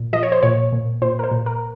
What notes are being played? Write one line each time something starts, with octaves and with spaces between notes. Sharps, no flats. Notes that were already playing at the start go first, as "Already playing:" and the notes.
Already playing: A#2
F3 D#5
C#5
C5
A#2 C#5
A#2
A#2 C5
A#4
C5
A#2
A#4